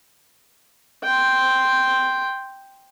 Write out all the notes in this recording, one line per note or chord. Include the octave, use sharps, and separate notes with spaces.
G5 C6